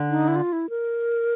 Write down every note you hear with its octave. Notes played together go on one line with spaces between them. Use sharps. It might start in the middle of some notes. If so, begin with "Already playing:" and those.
Already playing: D3
D#4
E4
F4
E4
A#4